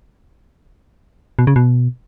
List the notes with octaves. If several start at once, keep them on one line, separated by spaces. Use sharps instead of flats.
B2
C#3
B2